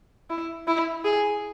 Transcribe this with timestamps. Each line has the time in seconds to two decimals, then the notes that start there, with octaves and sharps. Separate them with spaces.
0.30 E4
0.67 E4
1.05 G#4